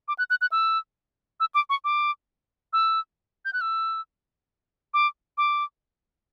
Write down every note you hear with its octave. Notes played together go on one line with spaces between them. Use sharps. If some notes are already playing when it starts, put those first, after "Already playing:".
D6
F#6
F#6
F#6
E6
E6
D6
C#6
D6
E6
G6
F#6
E6
D6
D6